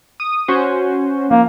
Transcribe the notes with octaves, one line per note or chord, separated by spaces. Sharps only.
D#6
C#4 F#4 C5
F3 A#3